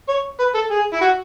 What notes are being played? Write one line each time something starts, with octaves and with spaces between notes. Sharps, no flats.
C#5
B4
A4
G#4
E4
F#4